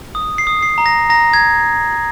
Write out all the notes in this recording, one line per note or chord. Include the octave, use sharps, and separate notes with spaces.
D#6
C7
D#6
C7
A#5
A#6
A#5 A#6
G#6